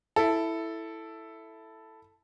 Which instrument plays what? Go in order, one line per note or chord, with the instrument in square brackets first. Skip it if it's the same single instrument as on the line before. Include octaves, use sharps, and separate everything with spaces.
[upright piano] E4 A4